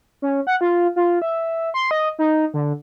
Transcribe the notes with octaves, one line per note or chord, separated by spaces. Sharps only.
C#4
F#5
F4
F4
E5
C6
D#5
D#4
D3